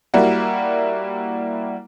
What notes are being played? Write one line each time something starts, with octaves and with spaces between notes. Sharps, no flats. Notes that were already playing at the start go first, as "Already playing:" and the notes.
G3 A#3 E4 F#4